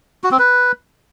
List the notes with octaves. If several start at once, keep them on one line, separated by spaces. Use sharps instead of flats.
F#4
C4
B4